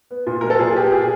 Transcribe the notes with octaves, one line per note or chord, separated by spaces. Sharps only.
B3
A#2
F#3 A#4
A4
A#2 G#4
B3 G4
A#2 G#4